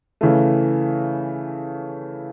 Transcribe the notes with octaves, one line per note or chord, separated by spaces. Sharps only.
C#3 E3 A3